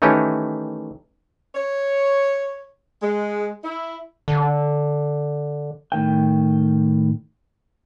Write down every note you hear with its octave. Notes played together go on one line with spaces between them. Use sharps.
D#3 E3 A3 C#4 D#4 G4
C#5
G#3
E4
D3
A2 D#3 G5